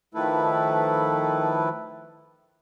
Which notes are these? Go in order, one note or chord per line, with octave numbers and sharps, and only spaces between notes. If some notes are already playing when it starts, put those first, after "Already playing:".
D#3 F3 A3 E4 A4 B4